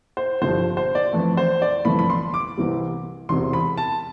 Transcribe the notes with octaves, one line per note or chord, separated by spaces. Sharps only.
C5
G1 G2 F3 C5
C5
D5
F2 E3 A3
C5
D5
G1 F2 E3 A3 B5
B5
C6
D6
C2 C3 E3 G3
E1 E2 C3 C6
B5
A5